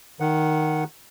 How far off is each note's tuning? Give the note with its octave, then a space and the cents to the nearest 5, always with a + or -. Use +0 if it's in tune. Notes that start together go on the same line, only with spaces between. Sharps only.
D#3 +0 F#5 +0